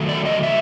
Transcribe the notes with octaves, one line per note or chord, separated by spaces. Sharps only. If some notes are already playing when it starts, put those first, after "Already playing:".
Already playing: D#3 F#3 A3
D5
D#5
E5